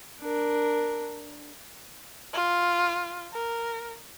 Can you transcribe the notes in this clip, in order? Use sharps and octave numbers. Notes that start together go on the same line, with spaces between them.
D4 A#4
F4
A#4